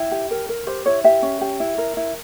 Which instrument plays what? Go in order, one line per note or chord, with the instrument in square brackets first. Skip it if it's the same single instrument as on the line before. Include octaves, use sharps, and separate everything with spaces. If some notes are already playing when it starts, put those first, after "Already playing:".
Already playing: [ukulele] E4 G5
G4
A#4
A#4
G4 C5
E4 C#5
G4 E5
C#4
G4
E4
A#4
E4